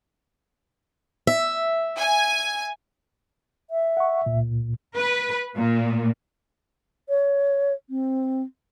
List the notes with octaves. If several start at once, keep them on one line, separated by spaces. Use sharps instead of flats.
E5
G#5
E5
F#5 C#6
C#2 A#2
B4
A#2
C#5
C4